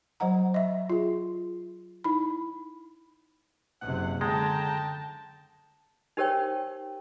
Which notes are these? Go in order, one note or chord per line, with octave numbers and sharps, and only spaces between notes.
F#3 C5 D#5 F#5 A#5
D#5 E5
F4 G#4
D#4 E4 B5
F#1 C3 F#5
D3 G#3 G5 A5 A#5
D#4 G4 A#4 C5 C#5 G5